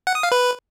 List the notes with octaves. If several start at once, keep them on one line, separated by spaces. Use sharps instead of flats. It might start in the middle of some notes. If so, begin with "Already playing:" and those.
F#5
D#6
F5
B4